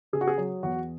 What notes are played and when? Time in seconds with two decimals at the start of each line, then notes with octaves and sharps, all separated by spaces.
0.13 C#3 G#4
0.21 F#4
0.28 G#4
0.38 F#3
0.63 E2 F#4